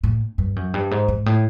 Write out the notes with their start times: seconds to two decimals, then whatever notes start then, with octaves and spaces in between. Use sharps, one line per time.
0.04 A2
0.38 G2
0.56 F#2
0.74 G2
0.91 G#2
1.08 G#2
1.26 A2